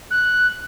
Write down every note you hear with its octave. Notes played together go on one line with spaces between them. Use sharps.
F#6